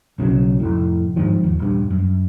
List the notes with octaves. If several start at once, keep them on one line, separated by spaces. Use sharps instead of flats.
B1 C#3 E3 F#3
F1 A2
G#2 B2 D#3 F3
D#2
D#1 G2
F#2